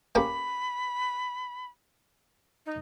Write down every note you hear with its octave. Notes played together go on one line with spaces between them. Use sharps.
A#3 C#4 G4 B5
D#4